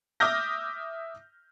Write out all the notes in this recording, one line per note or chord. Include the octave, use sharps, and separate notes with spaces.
E5 D6 D#6 F6 G6 A#6